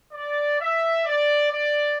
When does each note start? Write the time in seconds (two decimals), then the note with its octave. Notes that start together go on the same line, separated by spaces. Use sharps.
0.13 D5
0.59 E5
1.05 D5
1.52 D5